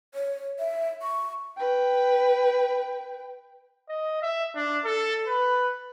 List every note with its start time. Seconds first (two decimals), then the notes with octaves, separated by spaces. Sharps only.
0.14 C#5
0.59 E5
1.02 C#6
1.57 B4 G5
3.89 D#5
4.23 E5
4.55 D4
4.85 A4
5.27 B4